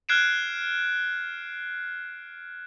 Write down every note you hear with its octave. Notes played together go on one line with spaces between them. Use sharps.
F6 F#6 G#6 C7 D7 E7